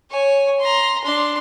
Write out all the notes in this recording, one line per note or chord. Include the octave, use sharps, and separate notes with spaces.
C#5 G#5
A#5 C6
D4 C6